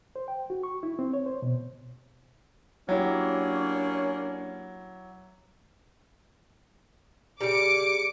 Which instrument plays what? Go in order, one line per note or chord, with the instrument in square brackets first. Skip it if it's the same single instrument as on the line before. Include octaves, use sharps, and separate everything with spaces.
[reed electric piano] C5
G5
F#4
C#6
E4
C4
C#5
C5
B2
[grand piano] F#3 E4 G4 [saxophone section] A#3 C#4 D4
[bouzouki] C#3 G3 [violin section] D6 C#7 D7